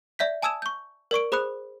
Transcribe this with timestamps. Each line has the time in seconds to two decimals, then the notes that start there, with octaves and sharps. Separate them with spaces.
0.19 D5 E5 G6 B6
0.42 G#5 A5 D#6 E6 G#6 E7
0.62 C#6 G6
1.11 A#4 D5 C#6 D7
1.32 G#4 C5 B5 D#6 F#6